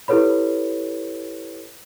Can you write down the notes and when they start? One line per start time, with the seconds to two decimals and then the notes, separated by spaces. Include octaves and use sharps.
0.08 E4 G4 A4 B4 C#5 B5